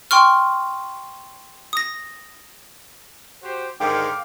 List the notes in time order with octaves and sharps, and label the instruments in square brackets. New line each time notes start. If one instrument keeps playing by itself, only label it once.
[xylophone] G5 C6 C#6 F6
D#6 A#6
[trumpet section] F#4 G4 C5
[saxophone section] G#2 D3 D#3 [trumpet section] F5 D6 [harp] G5